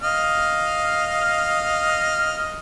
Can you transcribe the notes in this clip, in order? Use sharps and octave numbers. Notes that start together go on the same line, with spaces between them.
D#5 F5 F6